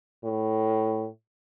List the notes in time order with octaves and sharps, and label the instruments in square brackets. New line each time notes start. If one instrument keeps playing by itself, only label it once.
[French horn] A2